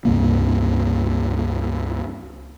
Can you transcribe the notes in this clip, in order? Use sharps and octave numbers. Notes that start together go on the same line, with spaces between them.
C#2 G2 C3 A#3